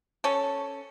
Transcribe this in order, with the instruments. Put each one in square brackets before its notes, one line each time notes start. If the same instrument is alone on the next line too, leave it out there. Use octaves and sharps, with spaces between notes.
[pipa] C#4 A4